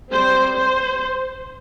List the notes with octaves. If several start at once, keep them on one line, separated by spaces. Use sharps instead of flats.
G3 C4 C5
C5